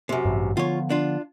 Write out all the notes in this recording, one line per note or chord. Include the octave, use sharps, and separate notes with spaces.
F#2 C3
A1 G2
D3 F3 B3 F4 C#5
D4 F4